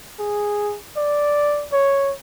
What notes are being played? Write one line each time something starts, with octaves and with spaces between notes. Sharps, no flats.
G#4
D5
C#5